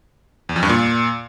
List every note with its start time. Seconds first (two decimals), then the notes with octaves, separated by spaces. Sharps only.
0.49 E2
0.56 F2
0.63 G2
0.69 A#2